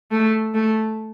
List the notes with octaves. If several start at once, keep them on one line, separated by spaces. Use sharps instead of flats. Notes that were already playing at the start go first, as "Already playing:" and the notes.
A3
A3